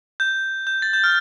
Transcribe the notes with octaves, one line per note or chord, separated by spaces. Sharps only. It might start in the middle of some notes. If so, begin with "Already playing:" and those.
G6
G6
A6
G6
F6